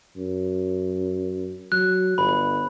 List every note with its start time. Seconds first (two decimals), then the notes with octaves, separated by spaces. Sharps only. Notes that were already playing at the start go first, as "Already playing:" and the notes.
0.16 F#2
1.72 F#3 F#6
2.18 G1 B5